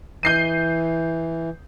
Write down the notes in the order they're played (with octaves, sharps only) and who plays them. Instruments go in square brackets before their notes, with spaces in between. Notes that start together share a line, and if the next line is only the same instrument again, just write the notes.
[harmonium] E3 [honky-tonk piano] G6 C7 D#7